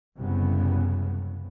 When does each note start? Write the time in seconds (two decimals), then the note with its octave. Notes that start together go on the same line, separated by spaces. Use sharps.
0.17 F#1 C2 F#2 C#3 B3